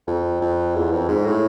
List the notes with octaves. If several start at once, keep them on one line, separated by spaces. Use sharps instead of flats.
F2
F2
E2
F2
G#2
A2